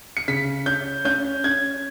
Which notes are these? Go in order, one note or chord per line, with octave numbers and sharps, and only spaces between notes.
C#7
C#3 B6
C#4 G6
C#4 G6
C#4 G#6